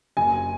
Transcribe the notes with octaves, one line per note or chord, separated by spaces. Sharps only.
F#1 G#5